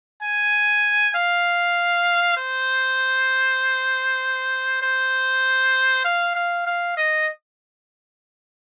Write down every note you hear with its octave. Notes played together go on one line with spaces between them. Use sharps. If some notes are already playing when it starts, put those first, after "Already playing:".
G#5
F5
C5
C5
F5
F5
F5
D#5